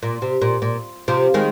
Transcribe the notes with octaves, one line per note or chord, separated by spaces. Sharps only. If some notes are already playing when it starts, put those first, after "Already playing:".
A#2
C3
A#2
A#2
C3 F3
D#3 G#3